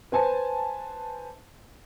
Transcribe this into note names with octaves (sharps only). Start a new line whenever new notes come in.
B4 C5 G#5 A5